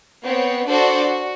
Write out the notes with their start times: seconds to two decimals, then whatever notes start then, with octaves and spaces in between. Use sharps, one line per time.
0.24 B3 C4 C#5
0.68 D4 F#4 A4 C5 D5
1.03 F#4